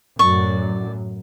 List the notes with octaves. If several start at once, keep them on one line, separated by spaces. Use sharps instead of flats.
F#2 A2 F#3 D5 C#6